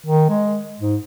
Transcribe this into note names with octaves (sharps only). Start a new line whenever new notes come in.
D#3
G#3
G#2